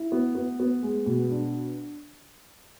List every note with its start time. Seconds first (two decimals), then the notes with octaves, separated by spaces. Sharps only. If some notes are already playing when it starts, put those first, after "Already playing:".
Already playing: E4
0.12 B3
0.35 B3
0.60 B3
0.83 G#3
1.06 B2
1.30 D4